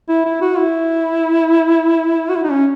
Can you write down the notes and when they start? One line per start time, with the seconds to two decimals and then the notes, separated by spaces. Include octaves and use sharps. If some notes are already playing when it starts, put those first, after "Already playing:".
0.09 E4
0.25 E4
0.41 F#4
0.58 E4
2.29 F#4
2.36 E4
2.44 D#4
2.51 C#4